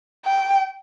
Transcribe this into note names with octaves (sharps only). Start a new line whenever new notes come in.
G5